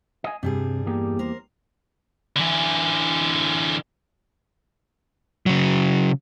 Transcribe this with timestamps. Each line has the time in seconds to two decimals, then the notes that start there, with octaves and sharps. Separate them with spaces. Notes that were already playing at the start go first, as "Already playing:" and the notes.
0.24 D#5 G#5
0.43 G2 C3 G3 G#4
0.86 E2 A#3 G4
1.19 A#4 C5
2.36 D3 E3
5.46 C#3 F#3